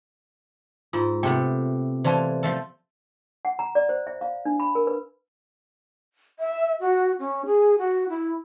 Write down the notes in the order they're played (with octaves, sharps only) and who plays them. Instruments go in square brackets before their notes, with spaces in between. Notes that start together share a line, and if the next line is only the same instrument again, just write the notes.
[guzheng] G#2 [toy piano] F4 E6
[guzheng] C3 A3 B3 [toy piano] G5
[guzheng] E3 A3 F4 [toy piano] C5 D5 A5
[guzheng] F3 A3 A4
[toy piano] F#5
A#5
D5
C5
E5
F5
D4
B5
A#4
B4
[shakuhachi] E5
F#4
C#4
G#4
F#4
E4